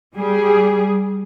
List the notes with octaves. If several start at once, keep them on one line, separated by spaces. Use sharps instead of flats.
G3 G#4